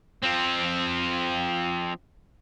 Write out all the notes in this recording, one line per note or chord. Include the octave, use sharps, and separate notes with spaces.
F3 C4